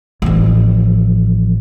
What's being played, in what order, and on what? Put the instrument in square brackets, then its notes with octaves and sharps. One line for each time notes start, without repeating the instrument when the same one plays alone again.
[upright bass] A1 F3